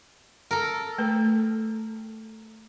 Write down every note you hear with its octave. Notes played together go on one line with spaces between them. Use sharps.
A4 A#4
A3 B4